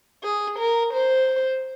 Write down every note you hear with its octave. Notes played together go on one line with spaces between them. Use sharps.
G#4
A#4
C5